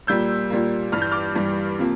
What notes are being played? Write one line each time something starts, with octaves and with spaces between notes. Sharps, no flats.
A#2 G3 A#3 E6 G6
A#2 G3 A#3
G2 E3 G3 F6
G6
D6 F6
G2 E3 G3
C3 F3 A#3